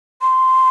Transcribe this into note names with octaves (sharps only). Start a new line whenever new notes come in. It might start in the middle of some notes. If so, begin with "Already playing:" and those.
C6